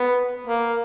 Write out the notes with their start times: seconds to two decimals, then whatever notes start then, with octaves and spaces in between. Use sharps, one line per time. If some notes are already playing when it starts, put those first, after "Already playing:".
Already playing: B3
0.47 A#3